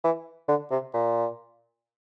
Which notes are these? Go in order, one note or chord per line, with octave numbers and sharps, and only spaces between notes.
E3
D3
C3
A#2